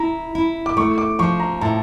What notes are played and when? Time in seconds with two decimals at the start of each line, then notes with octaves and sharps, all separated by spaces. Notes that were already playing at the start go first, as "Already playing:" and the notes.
Already playing: E4 A#5
0.35 E4
0.66 D6
0.77 A3 C#6
0.98 D6
1.19 F3 C#6
1.40 A#5
1.61 A2 A5